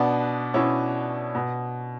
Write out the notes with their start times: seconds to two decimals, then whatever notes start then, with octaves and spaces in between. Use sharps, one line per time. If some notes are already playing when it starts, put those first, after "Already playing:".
Already playing: B2 B3 D4
0.54 B2 C#4 E4
1.35 B2